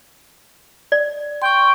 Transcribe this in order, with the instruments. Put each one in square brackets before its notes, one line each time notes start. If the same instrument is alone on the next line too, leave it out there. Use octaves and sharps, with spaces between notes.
[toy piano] D5
[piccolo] G5 [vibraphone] C6 C#6